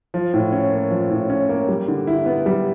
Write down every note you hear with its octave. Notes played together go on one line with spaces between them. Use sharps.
F3
A2
C#4
A#3
F3
A2
C#4
A#3
G3
D3
E4
B3
G3